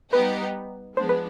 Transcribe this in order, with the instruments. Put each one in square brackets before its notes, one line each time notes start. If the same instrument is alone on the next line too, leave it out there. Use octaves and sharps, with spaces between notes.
[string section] G3 B3 D#4 G4 [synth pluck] B4
[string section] F3 G#3 B3 D4 [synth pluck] C5
[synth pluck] B4